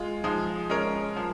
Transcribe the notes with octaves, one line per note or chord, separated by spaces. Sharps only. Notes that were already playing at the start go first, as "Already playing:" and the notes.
Already playing: G#3 F4
F3 G#3 D#4
G#3 C#4 A#4
F3